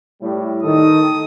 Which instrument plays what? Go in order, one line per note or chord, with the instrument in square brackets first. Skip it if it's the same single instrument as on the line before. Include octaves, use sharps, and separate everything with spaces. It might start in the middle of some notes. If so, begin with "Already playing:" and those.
[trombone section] A2 G3
[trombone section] D#3 A4 [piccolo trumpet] D#6